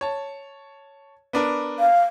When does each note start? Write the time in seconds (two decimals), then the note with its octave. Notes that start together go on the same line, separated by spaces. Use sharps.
0.01 C#5 A5
1.33 B3 D4 A#4
1.79 F5